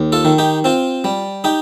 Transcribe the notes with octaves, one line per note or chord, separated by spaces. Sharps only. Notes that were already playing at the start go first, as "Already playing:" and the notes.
Already playing: D#2
F4 A4
D#3
D#4 G4
C4 F4
G3
D#4 G4